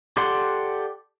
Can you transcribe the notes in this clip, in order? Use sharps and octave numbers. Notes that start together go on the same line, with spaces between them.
G4 A4 D5 F#5 C6